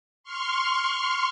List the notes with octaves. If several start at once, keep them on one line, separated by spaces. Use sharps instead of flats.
C6 C#6 F6